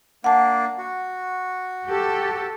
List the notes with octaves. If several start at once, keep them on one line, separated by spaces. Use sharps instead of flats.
A#3 D4 F#5 A5
F#4
G4 A4